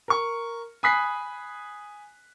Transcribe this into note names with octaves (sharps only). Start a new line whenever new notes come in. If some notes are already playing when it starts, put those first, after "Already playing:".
A#4 C#6
G#5 B5 D#6 F#6 B6 C7